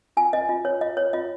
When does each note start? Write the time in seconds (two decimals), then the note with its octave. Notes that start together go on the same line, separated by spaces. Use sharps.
0.17 F4 G#5
0.33 C5 D#5
0.49 F4 D#5
0.65 C5 C#5
0.81 F4 D#5
0.97 C5 C#5
1.13 F4 D#5